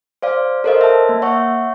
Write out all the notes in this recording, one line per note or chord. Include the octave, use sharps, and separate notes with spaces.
C5 D5 F5
A4 A#4 C5 C#5 D#5 F5
E5 A5
A#3
C#5 E5 F#5 C#6